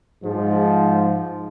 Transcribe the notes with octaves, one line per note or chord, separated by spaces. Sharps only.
G#2 F3